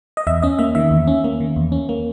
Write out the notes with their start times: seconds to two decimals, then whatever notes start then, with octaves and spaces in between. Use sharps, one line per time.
0.17 D#5
0.27 E2 E5
0.42 C#4 D#5
0.59 A#3 E5
0.75 D#3 E5
0.91 E2
1.07 C#4
1.24 A#3
1.40 D#3
1.56 E2
1.72 C#4
1.89 A#3